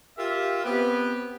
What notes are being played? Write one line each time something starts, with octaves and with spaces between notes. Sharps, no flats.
F4 G4 A#4 E5
B3 C4 G4 B4